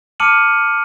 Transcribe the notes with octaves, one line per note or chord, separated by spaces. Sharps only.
A5 D6 F6 C#7 D#7 F#7